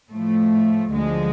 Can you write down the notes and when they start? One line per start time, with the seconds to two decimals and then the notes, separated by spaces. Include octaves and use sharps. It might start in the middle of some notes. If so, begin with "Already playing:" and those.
0.12 A2 F3 A3
0.91 D2 D3 F3 G#3